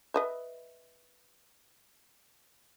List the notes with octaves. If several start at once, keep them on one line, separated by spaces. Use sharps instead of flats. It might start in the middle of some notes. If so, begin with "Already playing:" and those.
B4 D#5 E5